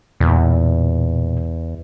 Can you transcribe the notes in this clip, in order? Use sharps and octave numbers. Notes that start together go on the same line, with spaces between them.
E2 A#2